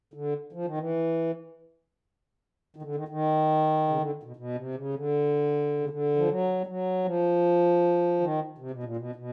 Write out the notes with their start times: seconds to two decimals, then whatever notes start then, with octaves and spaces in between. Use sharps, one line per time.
0.14 D3
0.53 F3
0.65 D#3
0.78 E3
2.76 D#3
2.82 D3
2.96 D#3
3.08 D#3
3.88 C#3
3.98 D3
4.23 B2
4.36 B2
4.55 C3
4.75 C#3
4.94 D3
5.80 C#3
5.89 D3
6.16 F3
6.28 F#3
6.61 G3
6.66 F#3
7.04 F3
8.20 D#3
8.58 C3
8.71 B2
8.83 A#2
8.97 B2
9.15 B2